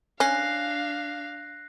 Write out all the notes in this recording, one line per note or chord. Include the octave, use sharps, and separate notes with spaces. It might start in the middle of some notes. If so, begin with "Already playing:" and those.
C#4 D4 F5 F#6 A#6 C7